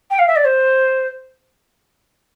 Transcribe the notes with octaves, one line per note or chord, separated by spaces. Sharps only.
G5
F5
E5
D5
C5